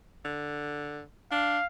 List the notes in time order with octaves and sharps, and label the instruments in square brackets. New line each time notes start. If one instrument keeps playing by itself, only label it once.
[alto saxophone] D3
[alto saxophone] D4 [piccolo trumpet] F5